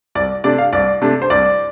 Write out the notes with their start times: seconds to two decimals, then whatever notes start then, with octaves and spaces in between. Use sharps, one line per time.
0.15 C2 D5
0.44 C3 A3 D4 D5
0.58 F5
0.73 C2 D5
1.02 C3 A3 D4
1.22 C5
1.30 C2 D5